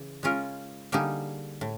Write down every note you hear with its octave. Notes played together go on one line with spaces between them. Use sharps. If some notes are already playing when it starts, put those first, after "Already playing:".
Already playing: C#3 E3
G#3 C#4 F4 A#4
D3 G3 A#3 D#4 G#4
A2